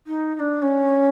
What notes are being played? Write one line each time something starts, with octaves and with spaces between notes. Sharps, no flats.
D#4
D#4
D4
C#4